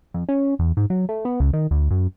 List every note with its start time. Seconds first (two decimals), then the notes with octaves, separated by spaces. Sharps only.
0.14 F2
0.29 C#4
0.59 E2
0.77 G#2
0.90 F#3
1.09 A3
1.25 B3
1.40 C#2
1.53 D#3
1.71 D2
1.91 F#2